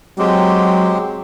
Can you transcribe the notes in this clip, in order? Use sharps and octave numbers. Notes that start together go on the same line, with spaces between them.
F#3 G#3 C4 G4